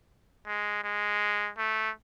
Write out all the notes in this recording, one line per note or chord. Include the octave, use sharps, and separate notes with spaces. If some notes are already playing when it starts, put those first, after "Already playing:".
G#3
G#3
A3